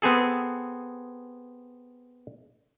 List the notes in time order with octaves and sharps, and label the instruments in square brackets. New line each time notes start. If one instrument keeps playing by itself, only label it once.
[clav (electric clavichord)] B3 C4 G#4 A4